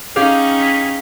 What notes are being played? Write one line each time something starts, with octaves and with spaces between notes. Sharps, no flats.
C#4 D#4 G4 G#4 F5
B6